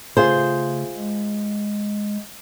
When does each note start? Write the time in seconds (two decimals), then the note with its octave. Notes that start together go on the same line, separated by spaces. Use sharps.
0.17 C#3 A3 F4 G#4 C5
0.96 G#3